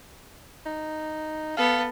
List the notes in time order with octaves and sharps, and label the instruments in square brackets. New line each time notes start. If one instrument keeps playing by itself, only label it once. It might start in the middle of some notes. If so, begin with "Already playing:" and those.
[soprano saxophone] D#4
[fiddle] B3 A4 [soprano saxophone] F5